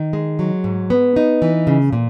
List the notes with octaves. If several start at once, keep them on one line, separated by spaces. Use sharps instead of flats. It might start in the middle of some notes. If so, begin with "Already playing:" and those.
Already playing: D#3
G#3
F#3
G#2
B3
D#4
E3
C#3
A#2